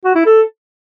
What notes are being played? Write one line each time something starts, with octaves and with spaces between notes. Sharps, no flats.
F#4
E4
A4